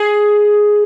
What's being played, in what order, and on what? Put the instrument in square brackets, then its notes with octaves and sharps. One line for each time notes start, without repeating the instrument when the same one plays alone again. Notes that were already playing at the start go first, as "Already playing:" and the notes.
Already playing: [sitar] G#4